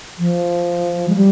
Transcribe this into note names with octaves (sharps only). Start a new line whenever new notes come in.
F3
G#3
G3